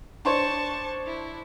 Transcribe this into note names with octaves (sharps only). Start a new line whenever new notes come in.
D4 C5 C#5 A5 C#6
E4